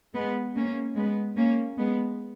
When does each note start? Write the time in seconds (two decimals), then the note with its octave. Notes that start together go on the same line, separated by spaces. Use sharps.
0.14 G#3 B3
0.56 A#3 C#4
0.96 G#3 B3
1.37 A#3 C#4
1.78 G#3 B3